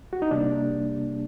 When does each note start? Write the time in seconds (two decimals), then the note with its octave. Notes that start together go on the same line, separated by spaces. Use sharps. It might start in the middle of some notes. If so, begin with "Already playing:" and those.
0.13 F#4
0.22 D#4
0.31 C3 G3 A#3 D4